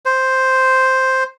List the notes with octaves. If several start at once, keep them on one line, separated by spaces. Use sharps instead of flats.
C5